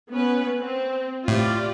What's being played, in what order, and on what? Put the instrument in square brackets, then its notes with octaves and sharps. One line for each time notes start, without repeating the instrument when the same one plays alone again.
[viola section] B3 C#4 B4
C4
[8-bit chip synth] A2 [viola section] F4 G4 D5